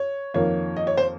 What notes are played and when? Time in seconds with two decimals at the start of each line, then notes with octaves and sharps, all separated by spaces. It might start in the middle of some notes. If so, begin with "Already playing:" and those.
Already playing: C#5
0.34 F2 D#3 A#3 C#5
0.77 D#5
0.87 C#5
0.97 C5